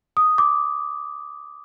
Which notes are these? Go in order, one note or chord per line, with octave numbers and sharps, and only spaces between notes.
D#6
D6